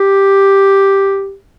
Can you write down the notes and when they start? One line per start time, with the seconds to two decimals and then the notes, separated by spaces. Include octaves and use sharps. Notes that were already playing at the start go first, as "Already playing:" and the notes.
Already playing: G4